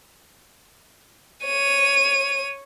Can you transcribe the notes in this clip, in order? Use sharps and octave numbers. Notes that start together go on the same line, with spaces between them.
C#5 D#7